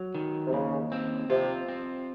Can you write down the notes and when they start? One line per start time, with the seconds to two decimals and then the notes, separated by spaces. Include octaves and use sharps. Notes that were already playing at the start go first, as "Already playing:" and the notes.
Already playing: F#3
0.15 D#3
0.47 C3
0.53 D#2 C#3
0.92 C4
1.30 C3 F4
1.69 C4